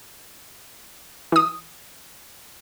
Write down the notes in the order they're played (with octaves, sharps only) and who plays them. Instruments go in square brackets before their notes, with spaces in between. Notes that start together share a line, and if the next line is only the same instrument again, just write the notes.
[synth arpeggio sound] E3 D#6